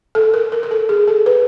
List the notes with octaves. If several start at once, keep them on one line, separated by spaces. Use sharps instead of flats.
A4
A#4
A#4
A#4
A4
G#4
A4
B4